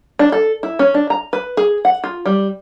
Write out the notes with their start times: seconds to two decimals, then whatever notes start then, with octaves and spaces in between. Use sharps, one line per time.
0.19 D4
0.32 A4
0.63 E4
0.79 C#4
0.94 D4
1.10 A#5
1.33 B4
1.57 G#4
1.85 F#5
2.04 F4
2.26 G3